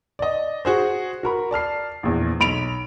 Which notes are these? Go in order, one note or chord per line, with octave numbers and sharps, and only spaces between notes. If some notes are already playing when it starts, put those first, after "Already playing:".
D5 D#5
F#4 G#4 C5
F#4 A#4 B5
D5 A5 F6 C7
A#1 E2
B1 B5 D7 F7